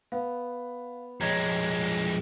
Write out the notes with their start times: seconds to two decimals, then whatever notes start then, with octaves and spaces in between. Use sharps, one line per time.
0.12 B3 F5
1.20 F2 G#3 C#5 A#5 G#6